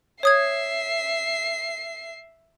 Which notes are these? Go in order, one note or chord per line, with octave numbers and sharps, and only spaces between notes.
C#5 E5 D#6 G#6 C7